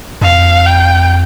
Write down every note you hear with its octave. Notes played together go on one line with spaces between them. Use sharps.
F2 F5
G5